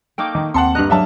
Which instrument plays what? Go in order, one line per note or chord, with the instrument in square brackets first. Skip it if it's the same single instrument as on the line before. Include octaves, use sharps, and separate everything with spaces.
[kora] A3 A#3 D#4 [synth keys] G5 D6
[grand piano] D#3
[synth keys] D#2 C4 C#7 [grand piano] F#5 A5 C6
[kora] G2 D3 D#5 [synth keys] A#5 F#6
[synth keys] F#3 G#3 [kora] A#3 F#5 [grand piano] D4 E5 A5